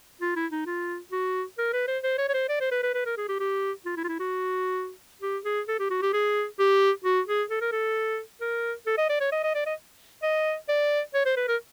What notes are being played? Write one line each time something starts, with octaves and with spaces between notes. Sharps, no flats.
F4
E4
D#4
F4
F#4
A#4
B4
C5
C5
C#5
C#5
C5
D5
C5
B4
B4
B4
A#4
G#4
G4
G4
F4
E4
F4
E4
F#4
G4
G#4
A4
G4
F#4
G4
G#4
G4
F#4
G#4
A4
A#4
A4
A#4
A4
D#5
D5
C#5
D#5
D#5
D5
D#5
D#5
D5
C#5
C5
B4
A#4